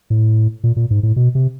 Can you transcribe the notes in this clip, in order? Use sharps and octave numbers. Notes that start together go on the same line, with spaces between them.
A2
A#2
A#2
G#2
A2
B2
C3